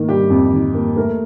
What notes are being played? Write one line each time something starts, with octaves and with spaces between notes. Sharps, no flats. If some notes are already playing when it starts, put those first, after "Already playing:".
Already playing: D#3 A#3
G3 G4
F2
D#3
A#3
A3 A#4